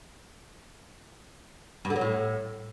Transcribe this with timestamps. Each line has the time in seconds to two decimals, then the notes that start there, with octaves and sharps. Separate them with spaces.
1.85 G2
1.90 D3
1.96 F#3
2.01 A2